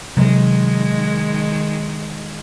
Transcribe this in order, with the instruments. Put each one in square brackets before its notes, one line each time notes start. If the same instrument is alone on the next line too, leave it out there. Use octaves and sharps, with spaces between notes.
[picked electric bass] C3 F#3 [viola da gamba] D#3 G#3